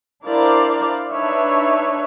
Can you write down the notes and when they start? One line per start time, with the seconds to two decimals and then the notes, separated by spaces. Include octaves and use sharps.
0.25 D4 E4 A#4 C5 D5 F5
1.11 D4 D#4 B4 C#5 E5